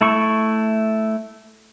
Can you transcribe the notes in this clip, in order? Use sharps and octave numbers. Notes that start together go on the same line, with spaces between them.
A3 E4 C#6